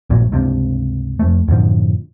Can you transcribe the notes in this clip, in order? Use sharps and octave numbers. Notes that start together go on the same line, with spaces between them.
A#1 G2 A#2 F#3
C#2 G2 C3
F2 A3
F#2 A2 D3 F3